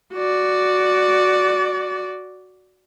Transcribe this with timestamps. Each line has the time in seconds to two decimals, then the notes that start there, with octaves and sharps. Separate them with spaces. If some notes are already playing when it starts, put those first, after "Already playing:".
0.14 F#4 D5